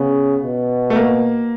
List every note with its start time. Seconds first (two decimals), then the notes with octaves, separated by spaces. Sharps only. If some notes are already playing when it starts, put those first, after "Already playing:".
Already playing: C#3 B3
0.43 B2
0.90 A3
0.96 A#3